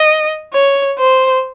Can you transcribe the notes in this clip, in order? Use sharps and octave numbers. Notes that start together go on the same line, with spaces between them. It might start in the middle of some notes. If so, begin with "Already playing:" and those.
Already playing: D#5
C#5
C5